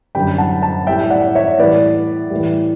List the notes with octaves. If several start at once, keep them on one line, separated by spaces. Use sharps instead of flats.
F#2 D3 G3 G5 B5
F#5 A5
F#5 A5
A2 G3 E5 G5
D5 F#5
D5
C#5 E5
A2 E3 G3 B4 D5
A2 E3 G3